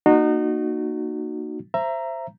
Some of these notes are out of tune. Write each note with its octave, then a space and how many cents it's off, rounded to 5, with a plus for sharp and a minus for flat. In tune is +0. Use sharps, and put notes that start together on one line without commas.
A#3 +0 D#4 -30 F#4 -5
C5 +5 E5 +25 A#5 +0